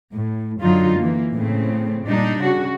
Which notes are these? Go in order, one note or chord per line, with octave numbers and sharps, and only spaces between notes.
A2
F#2 D3 F#3 D#4 F4
E3 A#3
A2 C#3 C4
A#2 G3 D4 D#4
C#3 F#4